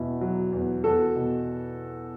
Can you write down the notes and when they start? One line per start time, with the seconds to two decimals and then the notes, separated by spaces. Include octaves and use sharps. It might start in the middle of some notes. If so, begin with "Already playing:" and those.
Already playing: E2 B2 E4
0.21 F#3
0.53 E2
0.84 E2 F#4 A4
1.16 B2